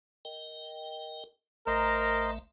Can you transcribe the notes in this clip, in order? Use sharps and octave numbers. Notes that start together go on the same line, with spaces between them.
A#4 D#5 G5
A1 A3 A#4 C5 D#5 E5 A#5